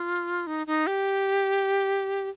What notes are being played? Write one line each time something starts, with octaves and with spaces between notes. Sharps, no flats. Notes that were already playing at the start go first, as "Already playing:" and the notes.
Already playing: F4
D#4
D#4
G4